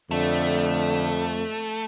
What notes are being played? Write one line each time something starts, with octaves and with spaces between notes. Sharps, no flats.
F2 D3 A3